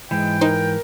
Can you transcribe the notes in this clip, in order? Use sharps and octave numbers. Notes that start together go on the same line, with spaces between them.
G#2 E3 G#3 G5
D#4 A#4 C5